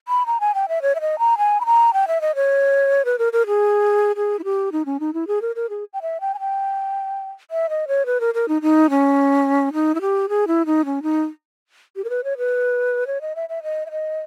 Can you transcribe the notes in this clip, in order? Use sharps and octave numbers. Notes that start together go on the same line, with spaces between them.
B5
A#5
G#5
G5
E5
C#5
E5
D#5
A#5
G#5
B5
A#5
G5
E5
D#5
C#5
B4
A#4
A#4
G#4
G#4
E4
G4
D#4
C#4
D#4
E4
G#4
A#4
A#4
G#4
G5
E5
G5
G#5
G5
E5
D#5
C#5
B4
A#4
A#4
D#4
D#4
C#4
D#4
E4
G4
G#4
E4
D#4
C#4
D#4
G4
A#4
B4
C#5
B4
C#5
D#5
E5
E5
D#5
E5
D#5